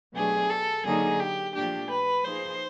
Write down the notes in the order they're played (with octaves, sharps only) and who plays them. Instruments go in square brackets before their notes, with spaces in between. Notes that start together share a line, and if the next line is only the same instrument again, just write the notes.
[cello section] B2 F#3 A3 D4 G4 [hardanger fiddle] G#4
[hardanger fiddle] A4
[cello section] D3 F#3 A#3 D#4 [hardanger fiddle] G#4
[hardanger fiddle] G4
[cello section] A#2 F3 A3 D4 [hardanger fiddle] G4
[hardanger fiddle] B4
[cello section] F3 A#3 D#4 G#4 [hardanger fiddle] C5